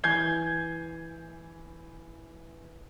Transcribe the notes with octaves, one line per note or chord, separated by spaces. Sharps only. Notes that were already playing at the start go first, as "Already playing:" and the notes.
E3 G#5 G6 G#6 C7 G7